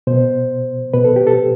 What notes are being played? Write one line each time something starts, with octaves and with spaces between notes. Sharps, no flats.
B2 C5
B2 B4
A4
G4
A4